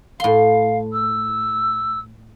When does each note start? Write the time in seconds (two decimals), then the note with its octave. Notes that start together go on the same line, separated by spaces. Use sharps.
0.20 A2 F5 C6
0.92 E6